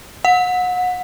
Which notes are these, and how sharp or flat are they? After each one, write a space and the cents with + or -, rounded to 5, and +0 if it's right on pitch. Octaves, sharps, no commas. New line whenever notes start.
F#5 -30